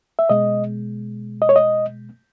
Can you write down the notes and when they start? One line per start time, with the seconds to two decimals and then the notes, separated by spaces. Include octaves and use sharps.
0.19 E5
0.29 B2 G#3 D#5
1.42 D#5
1.49 C#5
1.56 D#5